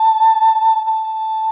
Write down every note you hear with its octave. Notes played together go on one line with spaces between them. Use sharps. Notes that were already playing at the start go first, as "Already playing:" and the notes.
Already playing: A5
A5